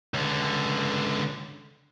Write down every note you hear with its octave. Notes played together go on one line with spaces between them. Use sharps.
C#2 D3